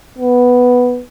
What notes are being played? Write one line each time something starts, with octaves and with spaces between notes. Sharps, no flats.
B3